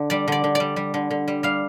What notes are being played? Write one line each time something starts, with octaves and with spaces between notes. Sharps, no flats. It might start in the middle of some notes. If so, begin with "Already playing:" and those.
Already playing: D3
G3 D5
D3 D5
D3
G3 D5
G3
D3
D3
G3
G3 F5